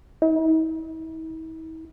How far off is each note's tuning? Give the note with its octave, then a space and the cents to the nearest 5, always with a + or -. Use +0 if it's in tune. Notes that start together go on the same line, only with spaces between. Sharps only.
E4 -45